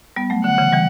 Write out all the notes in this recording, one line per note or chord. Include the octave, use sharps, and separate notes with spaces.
G3 B3
F#3 A3
D3 F#5
C#3 E3
E3 G3